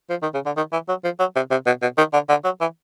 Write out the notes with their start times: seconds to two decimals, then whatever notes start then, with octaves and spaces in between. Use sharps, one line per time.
0.10 F3
0.22 D#3
0.34 C#3
0.46 D3
0.57 D#3
0.73 E3
0.89 F#3
1.04 F3
1.19 F#3
1.35 C3
1.51 C3
1.66 B2
1.82 B2
1.98 D#3
2.13 D3
2.29 D3
2.44 F#3
2.61 E3